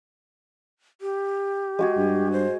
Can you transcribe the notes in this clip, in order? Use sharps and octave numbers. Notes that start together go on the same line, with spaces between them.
G4
G#3 F#4 G#4
G2
C5